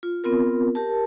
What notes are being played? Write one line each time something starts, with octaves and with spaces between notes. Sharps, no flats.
F4
B3 C4 F4 A#4
G4 A#4 A5